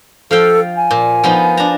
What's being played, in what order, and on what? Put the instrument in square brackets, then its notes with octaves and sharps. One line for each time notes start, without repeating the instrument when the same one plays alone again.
[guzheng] F3 F5 G5 [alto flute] A4
[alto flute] G#5
[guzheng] A#2
F3 B3 D#4
D4 A#5